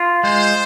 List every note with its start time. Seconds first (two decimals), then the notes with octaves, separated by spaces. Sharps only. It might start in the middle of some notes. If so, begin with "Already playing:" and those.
Already playing: F4
0.23 G#3 C5